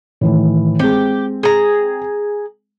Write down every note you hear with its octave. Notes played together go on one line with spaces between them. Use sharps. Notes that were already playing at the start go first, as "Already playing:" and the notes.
A2 D#3 E3
G#3 C4 G4
G#4 A#5